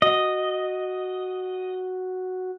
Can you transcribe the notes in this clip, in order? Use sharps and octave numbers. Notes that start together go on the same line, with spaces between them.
F#4 D#5